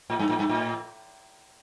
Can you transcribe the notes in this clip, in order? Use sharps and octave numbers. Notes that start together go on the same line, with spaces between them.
A2
G2
A2
G2
A2